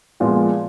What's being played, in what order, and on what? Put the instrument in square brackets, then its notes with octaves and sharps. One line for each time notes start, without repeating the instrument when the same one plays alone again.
[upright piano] A#2 F3 G#3 B3 F4